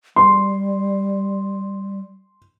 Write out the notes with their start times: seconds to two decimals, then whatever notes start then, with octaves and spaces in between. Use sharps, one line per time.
0.16 G3 C6